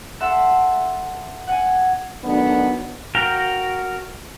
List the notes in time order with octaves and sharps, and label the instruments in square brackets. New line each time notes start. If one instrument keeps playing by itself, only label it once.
[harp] A4 E5 F#5 A5 C6 E6
F#5 G#5
[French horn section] D#3 F#3 A3 B3 D4
[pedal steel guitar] F#4 A#4 F5 G5